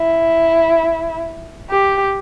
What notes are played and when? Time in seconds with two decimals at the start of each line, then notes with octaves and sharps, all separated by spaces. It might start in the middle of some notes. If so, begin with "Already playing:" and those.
Already playing: E4
1.70 G4